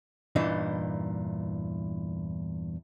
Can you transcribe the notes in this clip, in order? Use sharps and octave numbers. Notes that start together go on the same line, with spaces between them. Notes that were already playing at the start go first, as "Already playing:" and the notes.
E2 G2 A#2 E3 D4 D#4